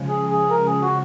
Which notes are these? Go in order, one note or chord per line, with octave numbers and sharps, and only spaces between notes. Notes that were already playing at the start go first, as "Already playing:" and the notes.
Already playing: C#3 F3 G#3
G#4
G#4
A#4
G#4
F#4